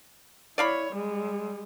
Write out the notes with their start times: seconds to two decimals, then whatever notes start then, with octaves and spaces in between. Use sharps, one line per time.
0.58 E4 C#5 D5 F5 B5
0.93 G3 G#3